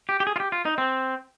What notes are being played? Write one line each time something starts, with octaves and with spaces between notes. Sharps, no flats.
G4
G4
G#4
F4
G4
F4
D#4
C4